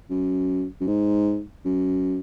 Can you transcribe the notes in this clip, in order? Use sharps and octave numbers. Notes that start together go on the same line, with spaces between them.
F#2
F#2
G#2
F#2